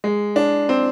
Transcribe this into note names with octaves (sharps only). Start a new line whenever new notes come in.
G#3
D4
C4